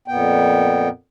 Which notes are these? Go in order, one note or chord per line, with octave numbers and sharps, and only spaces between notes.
F2 A#2 B3 G5